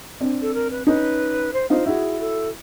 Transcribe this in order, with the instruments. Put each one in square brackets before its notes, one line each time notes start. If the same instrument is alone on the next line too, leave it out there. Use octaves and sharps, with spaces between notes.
[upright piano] C4 D4
[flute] A4
A#4
B4
[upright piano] C#4 D#4 [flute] B4
[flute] C5
[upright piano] D#4 F4 [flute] C5
[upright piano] E4 F#4 [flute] G#4
[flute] A4